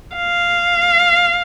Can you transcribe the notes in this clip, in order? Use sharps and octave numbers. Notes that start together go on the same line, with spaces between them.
F5